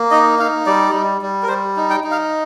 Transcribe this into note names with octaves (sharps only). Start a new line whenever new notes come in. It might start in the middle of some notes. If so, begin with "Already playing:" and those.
Already playing: A#3
D#4 D#5
D#4 F5
G3 D5
G3
G3
A#4
G3 C5
D#4
G5
D#4
F5